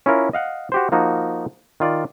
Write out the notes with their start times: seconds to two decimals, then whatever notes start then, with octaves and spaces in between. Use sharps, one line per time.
0.06 C#4 E4 F4 A#4
0.33 D#5 F5 F#5
0.72 F#4 G4 C5
0.92 F3 A#3 D#4 F#4
1.80 D#3 F4 D5